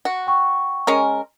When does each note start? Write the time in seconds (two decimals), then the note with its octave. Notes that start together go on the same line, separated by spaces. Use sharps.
0.05 F#4
0.27 G5 C#6
0.87 G#3 C#4 A#4